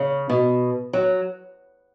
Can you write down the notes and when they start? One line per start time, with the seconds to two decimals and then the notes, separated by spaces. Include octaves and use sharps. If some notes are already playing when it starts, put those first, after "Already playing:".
Already playing: C#3
0.29 B2
0.93 F#3